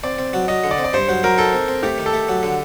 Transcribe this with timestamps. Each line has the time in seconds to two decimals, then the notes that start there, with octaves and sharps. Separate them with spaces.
0.03 C4 D5
0.18 C4
0.33 F#3
0.48 F#3 D#5
0.64 D3
0.71 D5
0.78 C4
0.84 D5
0.93 G2 C5
1.09 F#3 C5
1.23 F#3 A#4
1.38 D#4 A4
1.53 C4
1.68 C4
1.83 A3 G4
1.98 D#3
2.06 A4
2.13 A3
2.29 F#3
2.43 D3